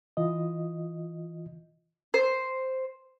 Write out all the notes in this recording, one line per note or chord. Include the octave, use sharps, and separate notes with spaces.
E3 F4 D#5
C5